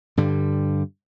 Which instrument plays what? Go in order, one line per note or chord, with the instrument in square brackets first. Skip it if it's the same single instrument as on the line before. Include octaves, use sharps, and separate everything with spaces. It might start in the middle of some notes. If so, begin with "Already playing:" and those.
[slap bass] G2 D3 G3